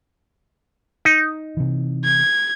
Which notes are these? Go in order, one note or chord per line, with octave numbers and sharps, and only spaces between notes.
D#4
C3 E3
G#6